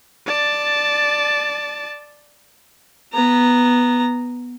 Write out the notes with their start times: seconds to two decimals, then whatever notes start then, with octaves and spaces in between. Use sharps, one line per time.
0.26 D5 A5
3.13 B3 A#5